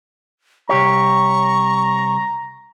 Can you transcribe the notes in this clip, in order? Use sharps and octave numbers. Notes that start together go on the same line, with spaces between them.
C2 G4 C#5 A#5 C#6